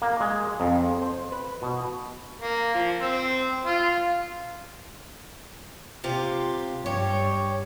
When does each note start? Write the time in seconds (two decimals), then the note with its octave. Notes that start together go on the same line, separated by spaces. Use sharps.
0.02 A#3
0.20 G#3
0.60 F2
1.01 C5
1.32 B4
1.62 B2
2.40 A#3
2.74 F3
3.00 C4
3.65 F4
6.04 C3 F4 G4
6.86 G2 G4 C#5